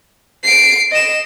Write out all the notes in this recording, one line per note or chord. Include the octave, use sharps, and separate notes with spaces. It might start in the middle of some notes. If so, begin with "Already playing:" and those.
C7 D7
D#5 E7